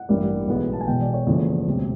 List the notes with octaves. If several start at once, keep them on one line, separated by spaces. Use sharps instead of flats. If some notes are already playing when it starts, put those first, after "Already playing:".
Already playing: F#5
A1 G2 E3 G3 A#3
B1 A2 E3 G#3 B3
A5
G#5
E1 E2 B2 G5
D5
C#5
F#1 E2 C#3 F3 A3
E1 D2 C3